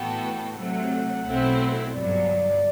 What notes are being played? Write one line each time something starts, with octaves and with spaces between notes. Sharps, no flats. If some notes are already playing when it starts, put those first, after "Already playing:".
Already playing: A2 E3 B3 F#4 A4 G5
C3 F#3 A3 F#5
B1 B2 A3 C4 E4
G1 G2 F#3 D5